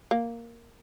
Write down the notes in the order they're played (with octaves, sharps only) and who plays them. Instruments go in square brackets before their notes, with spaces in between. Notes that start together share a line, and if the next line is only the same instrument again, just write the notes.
[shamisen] A#3